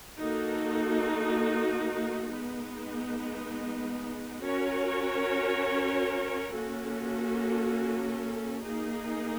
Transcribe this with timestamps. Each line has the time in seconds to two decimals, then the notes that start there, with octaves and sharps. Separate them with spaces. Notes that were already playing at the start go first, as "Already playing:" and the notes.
0.20 A#3 D#4 F#4 A4
2.30 G#3 B3 D#4
4.41 C#4 F#4 A#4 C#5
6.52 A#3 C#4 F#4 A4
8.63 A#3 D#4 G#4